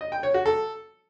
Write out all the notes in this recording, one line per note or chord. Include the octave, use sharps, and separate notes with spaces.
D#5
G5
C#5
F#4
A4